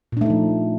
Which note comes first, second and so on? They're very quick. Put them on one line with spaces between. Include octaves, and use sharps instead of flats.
A#2 D4 A3 D#4 F3